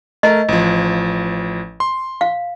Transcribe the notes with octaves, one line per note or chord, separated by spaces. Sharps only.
A3 A#4 D#5
A1 F3
C6
F5